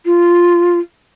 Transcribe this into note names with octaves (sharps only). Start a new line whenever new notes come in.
F4